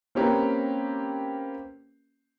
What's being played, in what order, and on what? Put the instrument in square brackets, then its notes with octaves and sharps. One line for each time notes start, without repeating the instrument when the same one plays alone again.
[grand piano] A#3 C4 C#4 G4 A#4 B4